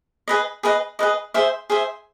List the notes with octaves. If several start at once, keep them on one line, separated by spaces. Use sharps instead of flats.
G#4 B4 D#5
G#4 B4 D#5
G#4 B4 D#5
G#4 C5 E5
G#4 C5 E5